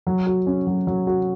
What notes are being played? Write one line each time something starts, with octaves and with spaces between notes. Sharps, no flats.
F#3
F#4
C#4
F#3
F#3
F#4